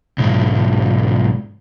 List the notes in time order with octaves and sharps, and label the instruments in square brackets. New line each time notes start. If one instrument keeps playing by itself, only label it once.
[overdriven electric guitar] B1 G#2